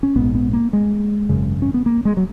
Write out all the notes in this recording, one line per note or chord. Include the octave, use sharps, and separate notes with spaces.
C#4
A#1 G#2 B3
B3
A#3
G#3
G#1 F#2 C#3
C#4
B3
A#3
G#3
F#3